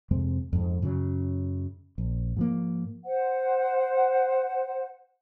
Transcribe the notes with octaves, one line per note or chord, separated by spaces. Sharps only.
F2 C3 G#3 C4
F2 G#2
F#2 C#3 F#3
A#1
G#2 F3 A#3
C5 F#5